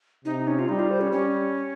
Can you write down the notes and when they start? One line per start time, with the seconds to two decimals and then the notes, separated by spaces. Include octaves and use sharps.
0.25 C3 D#4
0.47 C#4
0.59 F4
0.69 G3 D#4
0.79 F4
0.91 C5
1.01 C#4
1.12 G3 C#4